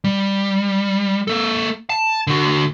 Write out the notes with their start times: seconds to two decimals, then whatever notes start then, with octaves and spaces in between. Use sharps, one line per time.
0.04 G3
1.27 A#3 A4
1.90 A5
2.27 D3 F#4